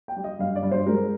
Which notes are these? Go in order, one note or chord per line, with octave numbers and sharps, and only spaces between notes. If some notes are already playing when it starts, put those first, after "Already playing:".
G5
G3
D#5
G2 F5
D5
G2
C5
G#3 A#4